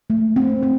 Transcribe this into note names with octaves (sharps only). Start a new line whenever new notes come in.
A3
C4
C4